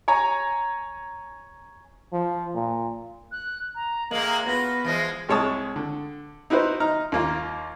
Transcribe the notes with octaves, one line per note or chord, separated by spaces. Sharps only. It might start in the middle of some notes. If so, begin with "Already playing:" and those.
C#5 G#5 A#5
F3
A#2
F#6
A#5
A2 G#3 A#3 F#7
B3 F4 F#4 B4 A#6
E3 F3 G#3
C2 G#3 C#5 A5 D#6
D3
D#4 E4 F#4 B4 C5
D#4 A#5 F6
D#2 A#3 F4